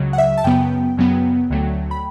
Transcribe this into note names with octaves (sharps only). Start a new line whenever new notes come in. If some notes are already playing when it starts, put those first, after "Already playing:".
Already playing: C#2 C#3 F#3
F#5
E5
A5
F#2 C#3 F#3 B3 G5
F#2 C#3 F#3 B3
D2 D3 F#3 A3
B5